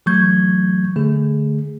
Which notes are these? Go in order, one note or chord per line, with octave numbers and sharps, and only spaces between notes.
E3 F#3 A3 C#6 G6 G#6
D3 A3 G#4